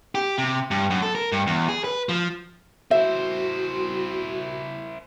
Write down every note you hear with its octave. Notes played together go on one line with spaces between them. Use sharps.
G4
C3
G2
F#2
A4
A#4
G2
E2
G#4
B4
F3
E4 F#4 C5 E5